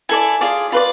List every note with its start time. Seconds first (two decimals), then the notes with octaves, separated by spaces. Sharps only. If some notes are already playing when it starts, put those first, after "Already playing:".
0.09 E4 A4 D5 G#5
0.41 F4 G#4 D5
0.72 F4 B4 D5 B5